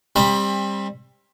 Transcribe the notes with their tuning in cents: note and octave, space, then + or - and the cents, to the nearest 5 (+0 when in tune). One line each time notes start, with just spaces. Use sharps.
G3 +25 C4 +30 B5 +0